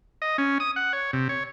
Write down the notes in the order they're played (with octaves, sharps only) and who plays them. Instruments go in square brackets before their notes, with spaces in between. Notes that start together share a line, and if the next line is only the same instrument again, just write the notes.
[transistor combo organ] D#5
C#4
D#6
F#5
C#5
C3
C#5